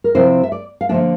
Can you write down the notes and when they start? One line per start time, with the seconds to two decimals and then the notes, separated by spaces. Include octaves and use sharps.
0.04 A#4
0.15 C3 F3 C4 E4 C5
0.43 E5
0.52 D5
0.81 F5
0.89 D3 F3 A#3 D4 E5